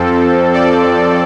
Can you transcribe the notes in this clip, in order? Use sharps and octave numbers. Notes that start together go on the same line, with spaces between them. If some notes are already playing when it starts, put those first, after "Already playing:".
Already playing: F2 F3 C4 A4
A4 D5